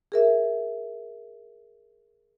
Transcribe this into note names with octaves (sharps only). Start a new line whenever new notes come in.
G#4 A#4 E5